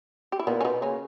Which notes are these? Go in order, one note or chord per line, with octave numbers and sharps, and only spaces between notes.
G4
E4
A#2 B3 D#4
C#4
B2 B3 D#4
C#3 A#3 C#4